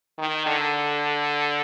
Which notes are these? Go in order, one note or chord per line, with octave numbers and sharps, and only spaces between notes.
D#3
D3